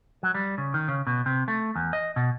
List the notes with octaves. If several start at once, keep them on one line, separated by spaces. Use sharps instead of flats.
F#3
G3
C#3
D#3
C#3
B2
C3
A3
E2
D#5
B2